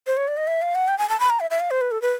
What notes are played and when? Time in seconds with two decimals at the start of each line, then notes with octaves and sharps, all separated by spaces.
0.07 C5
0.17 C#5
0.28 D5
0.37 D#5
0.47 E5
0.62 F5
0.75 F#5
0.88 G5
0.98 G#5
1.09 A5
1.20 B5
1.30 A#5
1.40 E5
1.50 E5
1.60 F5
1.71 C5
1.81 B4
1.91 A4
2.02 B4